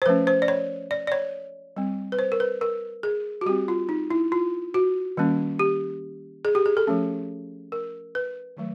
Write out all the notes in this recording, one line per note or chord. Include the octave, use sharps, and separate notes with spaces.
C5
F3 A3 C#4 B4
C5
D5
C#5
D5
D5
C#5
G3 C4
B4
C5
A#4
B4
A#4
G#4
F#4
G3 C4 G4
F4
D#4
E4
F4
F#4
D#3 G3 A#3 C#4
G4
G#4
G4
G#4
A4
F3 A3 C#4
A#4
B4
D#3 F#3 A3